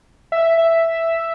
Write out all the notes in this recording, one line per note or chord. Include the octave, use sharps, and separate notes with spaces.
E5
E5